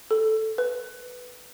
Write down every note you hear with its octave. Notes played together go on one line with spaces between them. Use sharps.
A4
B4